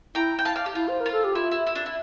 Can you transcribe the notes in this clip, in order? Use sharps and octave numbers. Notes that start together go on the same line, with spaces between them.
E4 G5 A#5
G5
F5 A5
D5 F5
G4
E4 F4
C5
A#4
F4
A4
G4
E4 F4
E4
E4
D4
E4